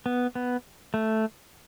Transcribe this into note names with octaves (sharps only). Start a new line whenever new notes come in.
B3
B3
A3